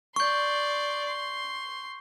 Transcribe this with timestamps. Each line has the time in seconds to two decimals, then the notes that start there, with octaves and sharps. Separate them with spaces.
0.16 D5 C6 C#6 G6
1.06 C6